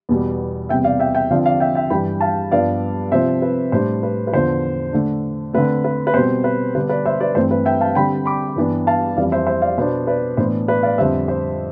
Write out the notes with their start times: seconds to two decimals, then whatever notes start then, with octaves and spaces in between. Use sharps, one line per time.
0.09 E2 B2 G3 B3
0.69 E2 C3 G3 E5 G5
0.84 D5 F5
1.00 E5 G5
1.15 E5 G5
1.31 D3 F3 C4 D5 F5
1.46 D5 F5
1.60 E5 G5
1.75 E5 G5
1.90 G2 E3 G3 G5 B5
2.21 F5 A5
2.51 G2 F3 B3 D4 D5 F5
3.12 C3 F3 C4 C5 E5
3.42 B4
3.72 A2 G3 D4 C5
4.03 B4
4.27 B4
4.32 E2 D3 F3 C5
4.93 D3 A3 D4
5.53 D3 A3 C4 B4
5.84 B4
6.07 B4
6.14 B2 G3 C4 C5
6.44 B4
6.75 D3 G3 B3 D4 B4
6.89 B4 D5
7.05 C5 E5
7.20 B4 D5
7.35 G2 E3 A3 C4 C5
7.51 B4
7.65 E5 G5
7.81 F5 A5
7.95 D3 G3 C4 G5 B5
8.26 B5 D6
8.56 G2 E3 B3 D4
8.87 F5 A5
9.17 F2 E3 G3 D5 F5
9.32 C5 E5
9.47 C5 E5
9.62 D5 F5
9.78 B2 B3 D4 C5
10.07 B4 D5
10.37 A2 E3 B3 D4 C5
10.68 B4 D5
10.83 D5 F5
10.98 F2 D3 G3 C5 E5
11.28 C5